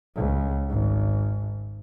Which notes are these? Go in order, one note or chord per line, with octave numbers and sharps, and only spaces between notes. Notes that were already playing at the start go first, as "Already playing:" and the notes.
C#2
G#1